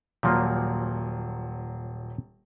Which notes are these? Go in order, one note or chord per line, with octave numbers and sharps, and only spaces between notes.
D#1 A#2 F3 F#3 A#3